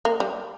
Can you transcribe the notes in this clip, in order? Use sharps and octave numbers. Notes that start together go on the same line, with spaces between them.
A#3
G3